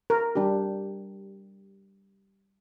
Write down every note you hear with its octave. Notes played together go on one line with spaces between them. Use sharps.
A#4
G3 D4 G4